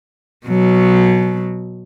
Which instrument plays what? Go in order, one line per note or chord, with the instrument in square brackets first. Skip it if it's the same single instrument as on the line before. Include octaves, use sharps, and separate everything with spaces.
[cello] B2 F#3